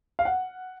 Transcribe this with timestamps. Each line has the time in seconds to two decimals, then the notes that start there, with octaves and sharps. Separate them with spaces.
0.19 F5
0.25 F#5